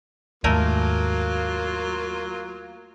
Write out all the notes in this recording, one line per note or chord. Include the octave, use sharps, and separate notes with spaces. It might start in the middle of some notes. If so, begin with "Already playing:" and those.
D#2 G#2 F#3 A3 A#3 F4 A#4 G#5